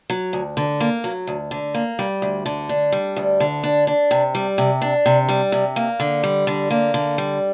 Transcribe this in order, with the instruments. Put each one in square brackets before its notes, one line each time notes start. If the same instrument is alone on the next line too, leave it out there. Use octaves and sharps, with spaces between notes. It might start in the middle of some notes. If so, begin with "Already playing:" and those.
[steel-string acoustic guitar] F#3
D2
D3
A#3
F#3
D2
D3
A#3
G3
D2
D3
D4
G3
D2
D3
D4
D4
C3
G3
C3
D4
C3
G3
C3
A#3
D3
G3
D3
A#3
D3
G3